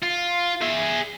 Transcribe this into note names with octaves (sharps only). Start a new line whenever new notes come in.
F4
G#4 E5